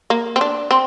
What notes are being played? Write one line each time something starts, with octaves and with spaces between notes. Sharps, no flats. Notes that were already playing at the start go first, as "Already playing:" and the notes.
A#3
C4
D4
C4